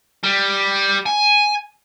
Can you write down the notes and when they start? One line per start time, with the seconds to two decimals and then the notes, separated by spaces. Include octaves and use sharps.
0.23 G3
1.06 G#5